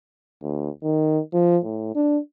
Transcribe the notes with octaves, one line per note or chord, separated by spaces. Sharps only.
D2
D#3
F3
A2
D4